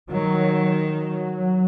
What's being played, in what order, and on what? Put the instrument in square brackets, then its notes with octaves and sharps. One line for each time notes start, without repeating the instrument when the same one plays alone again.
[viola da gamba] D#3 [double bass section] F#3
[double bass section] F#3